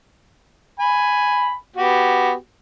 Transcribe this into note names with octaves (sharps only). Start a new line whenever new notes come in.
G#5 B5
B3 F#4 G4